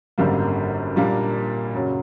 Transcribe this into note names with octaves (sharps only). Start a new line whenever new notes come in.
G#1 F#2 D3 G3 A#3
A#2 G3 A#3 D4
F#2 C#3 F#3